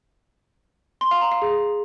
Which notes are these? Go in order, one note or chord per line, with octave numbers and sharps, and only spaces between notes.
C6
F5
A#5
F5
G#4